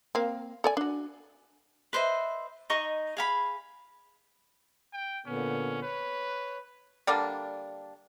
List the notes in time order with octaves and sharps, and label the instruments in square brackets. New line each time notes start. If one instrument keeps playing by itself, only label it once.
[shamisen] A#3 C4 F5
A4 D5 G#5
D4 F#4
[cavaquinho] B4 C5 D#5 E5
D#4 D#5 C#6 D#6
G#4 F5 B5
[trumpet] G5
[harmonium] A#2 D3 B3 [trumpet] C#4
[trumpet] B4 [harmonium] C#5
[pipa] D3 G3 A#3 D4